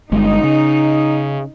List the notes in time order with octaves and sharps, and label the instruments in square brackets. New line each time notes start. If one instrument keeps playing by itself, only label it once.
[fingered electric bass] G1 G2 G#3 [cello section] D#4
[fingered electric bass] C#3